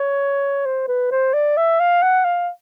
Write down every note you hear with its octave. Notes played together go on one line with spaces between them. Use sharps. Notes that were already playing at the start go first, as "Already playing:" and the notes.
Already playing: C#5
C5
B4
C5
D5
E5
F5
F#5
F5